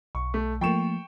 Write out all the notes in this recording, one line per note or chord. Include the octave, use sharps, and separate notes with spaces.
B1 C#6
A3
F3 A3 A#3 G5 C#6 E7